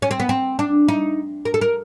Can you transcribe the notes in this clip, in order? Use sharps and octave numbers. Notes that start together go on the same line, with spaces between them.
C#4
C4
B3
C4
D4
D#4
A#4
A4
A#4